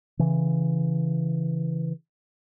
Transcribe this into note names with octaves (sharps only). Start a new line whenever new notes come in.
C#3 E3